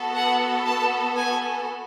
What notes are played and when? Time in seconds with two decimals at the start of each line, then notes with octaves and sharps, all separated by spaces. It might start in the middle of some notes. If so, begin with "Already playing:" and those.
Already playing: B3 F#4 A4
0.15 F#5
0.66 A5
1.17 G#5